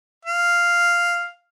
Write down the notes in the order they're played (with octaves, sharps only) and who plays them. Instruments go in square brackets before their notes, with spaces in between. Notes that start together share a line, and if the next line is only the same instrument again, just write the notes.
[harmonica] F5